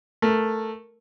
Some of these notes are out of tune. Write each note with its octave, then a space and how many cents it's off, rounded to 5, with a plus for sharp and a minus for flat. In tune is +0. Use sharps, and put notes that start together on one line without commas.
A3 +0 A#4 +0